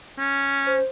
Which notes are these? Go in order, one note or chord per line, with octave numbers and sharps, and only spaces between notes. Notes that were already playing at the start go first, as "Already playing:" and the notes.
C#4
C5